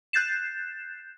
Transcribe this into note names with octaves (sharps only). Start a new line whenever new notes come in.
F#6 G6 A6 C7 E7